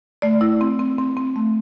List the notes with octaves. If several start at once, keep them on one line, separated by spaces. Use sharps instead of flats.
A3 D5
E4
C4
C4
C4
C4
A3